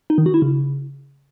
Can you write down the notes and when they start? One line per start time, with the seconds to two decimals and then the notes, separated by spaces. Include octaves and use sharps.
0.10 D#4
0.18 D#3
0.26 F#4
0.34 E4
0.42 C#3